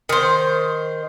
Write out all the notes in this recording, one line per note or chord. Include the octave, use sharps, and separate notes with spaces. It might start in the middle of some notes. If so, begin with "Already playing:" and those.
D#3 C5